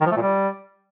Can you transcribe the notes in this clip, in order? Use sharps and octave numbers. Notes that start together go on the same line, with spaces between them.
D#3
F3
A3
A#2
G3